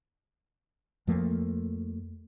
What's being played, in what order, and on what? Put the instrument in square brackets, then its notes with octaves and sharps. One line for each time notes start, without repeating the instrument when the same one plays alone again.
[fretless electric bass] F2 F3 A3 A#3